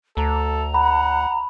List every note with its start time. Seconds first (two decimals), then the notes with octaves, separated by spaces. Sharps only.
0.17 D2 A4 A#5
0.74 F#5 B5